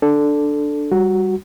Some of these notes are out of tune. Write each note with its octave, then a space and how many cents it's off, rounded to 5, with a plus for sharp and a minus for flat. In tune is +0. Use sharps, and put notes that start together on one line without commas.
D4 +0 A4 +0
G3 +0 F#4 +0